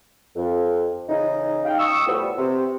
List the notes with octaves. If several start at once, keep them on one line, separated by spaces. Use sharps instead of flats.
F2
C#3 E3 D#4
F5 G5
C#6 D#6 E6
A2 F3 G3 B3
C3